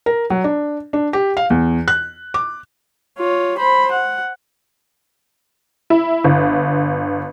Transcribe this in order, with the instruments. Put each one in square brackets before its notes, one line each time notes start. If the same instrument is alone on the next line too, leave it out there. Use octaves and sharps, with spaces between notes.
[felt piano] A#4
F#3
D4
D4
G4
F5
E2
F#6
D6
[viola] F4 C#5
C5 B5
F#5
[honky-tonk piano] E4
G1